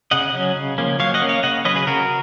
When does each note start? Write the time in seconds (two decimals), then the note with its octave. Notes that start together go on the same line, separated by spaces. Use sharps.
0.11 C#3 D#5 F#5
0.33 F#3 C#4
0.56 C#3
0.78 F3 A#3 C#4
1.00 F#3 C#5 F5
1.14 D#5 F#5
1.22 A#3 C#4
1.29 C#5 F5
1.43 C#3 D#5 F#5
1.65 F#3 C#4 B4 D#5
1.76 G#4 B4
1.87 C#3 F#4 A#4